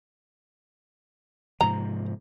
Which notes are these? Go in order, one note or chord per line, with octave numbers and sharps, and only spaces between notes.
G#2 C3 F3 A#5